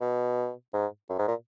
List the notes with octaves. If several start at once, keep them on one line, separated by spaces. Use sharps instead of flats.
B2
G#2
F#2
G#2
A#2